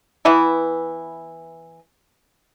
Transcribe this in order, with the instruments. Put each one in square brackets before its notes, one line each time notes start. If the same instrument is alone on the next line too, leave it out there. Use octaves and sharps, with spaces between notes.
[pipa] E3 B3 E4